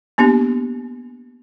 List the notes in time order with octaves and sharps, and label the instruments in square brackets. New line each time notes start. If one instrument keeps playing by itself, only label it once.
[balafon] A#3 B3 D4 G4